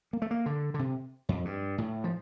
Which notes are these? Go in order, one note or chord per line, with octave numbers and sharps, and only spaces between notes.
A#3
A3
A#3
D3
D3
C3
F2
G2
A2
F3